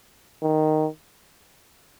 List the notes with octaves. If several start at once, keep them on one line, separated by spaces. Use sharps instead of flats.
D#3